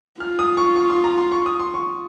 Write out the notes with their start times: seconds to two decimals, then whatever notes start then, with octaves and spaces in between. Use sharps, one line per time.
0.20 F4 F6
0.39 D#6
0.57 C#6
0.76 C#6
0.90 C6
1.04 A#5
1.18 C6
1.32 C#6
1.46 D#6
1.59 C6
1.74 C#6